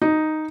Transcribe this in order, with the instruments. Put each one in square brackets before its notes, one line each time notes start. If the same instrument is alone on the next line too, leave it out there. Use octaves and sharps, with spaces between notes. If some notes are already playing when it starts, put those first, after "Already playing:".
[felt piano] D#4